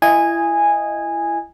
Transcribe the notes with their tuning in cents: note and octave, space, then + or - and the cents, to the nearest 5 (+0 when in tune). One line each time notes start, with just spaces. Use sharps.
E4 +30 D#5 +0 G#5 -10